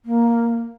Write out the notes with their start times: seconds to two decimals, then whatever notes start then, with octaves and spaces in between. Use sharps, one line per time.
0.05 A#3